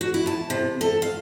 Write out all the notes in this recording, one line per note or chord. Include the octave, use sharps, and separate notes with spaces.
F#4
E4
A5
C3
A4
F5